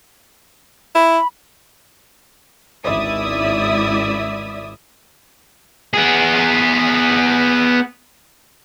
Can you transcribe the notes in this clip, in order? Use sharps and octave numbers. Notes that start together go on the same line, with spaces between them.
E4 B5
G#1 C#2 E4 D5 E5 D#6
B3 G#4